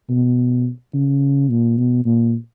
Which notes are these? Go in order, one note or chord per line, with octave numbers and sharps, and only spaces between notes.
B2
C#3
A#2
B2
A#2